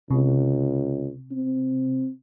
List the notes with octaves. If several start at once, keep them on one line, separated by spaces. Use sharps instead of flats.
C#2 C3
C4